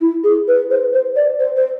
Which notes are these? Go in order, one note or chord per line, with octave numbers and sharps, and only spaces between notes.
E4
G#4
B4
C5
C5
D5
C5
C5